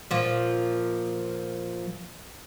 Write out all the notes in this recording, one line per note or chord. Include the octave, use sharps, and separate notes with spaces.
A#2 F3